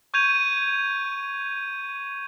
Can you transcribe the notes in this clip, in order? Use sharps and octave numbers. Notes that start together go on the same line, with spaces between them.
C#6 G6 G#6 D#7 F7